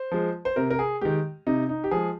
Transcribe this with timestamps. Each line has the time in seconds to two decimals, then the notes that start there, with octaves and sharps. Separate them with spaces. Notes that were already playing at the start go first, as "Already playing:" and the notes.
Already playing: C5
0.11 F3 G#3
0.45 C5
0.56 C3 A#4
0.70 A#4
0.79 G#4
1.01 D#3 G#3 G4
1.47 C3 D#4
1.69 D#4
1.84 G4
1.91 F3 G#3 G#4